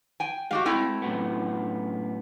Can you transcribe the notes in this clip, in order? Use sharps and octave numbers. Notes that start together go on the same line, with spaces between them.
G5 G#5
G#3 F#4 G4 F5
A3 C4 E4
F#2 A2 B3